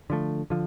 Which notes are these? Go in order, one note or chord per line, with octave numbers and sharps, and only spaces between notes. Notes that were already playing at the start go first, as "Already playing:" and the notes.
D3 F3 A3
D3 F3